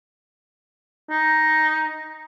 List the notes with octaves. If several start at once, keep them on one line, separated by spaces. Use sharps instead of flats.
D#4